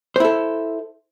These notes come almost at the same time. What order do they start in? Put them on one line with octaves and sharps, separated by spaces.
C5 E4 A4